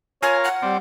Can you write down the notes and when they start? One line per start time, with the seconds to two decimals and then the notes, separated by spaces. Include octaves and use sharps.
0.23 F4 A#4 C#5 F5 G#5
0.44 F#5
0.62 G3 C4 D5